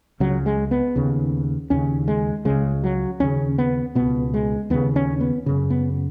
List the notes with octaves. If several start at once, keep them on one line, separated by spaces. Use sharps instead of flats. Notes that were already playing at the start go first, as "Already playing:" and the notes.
C#2 C#3 F#3
G#3
B3
D#2 C#3
D#2 C#3 C#4
G#3
C#2 C#3 G#3
F#3
D#2 C#3 C#4
B3
C#2 B2 B3
G#3
D#2 C#3 B3
C#4
B3
F#2 C#3
B3